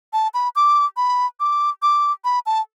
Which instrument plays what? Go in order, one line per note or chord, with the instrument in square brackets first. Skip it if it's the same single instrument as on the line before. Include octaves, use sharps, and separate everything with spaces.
[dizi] A5
B5
D6
B5
D6
D6
B5
A5